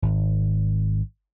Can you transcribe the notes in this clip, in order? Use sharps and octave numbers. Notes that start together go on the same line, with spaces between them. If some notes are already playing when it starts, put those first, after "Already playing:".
G#1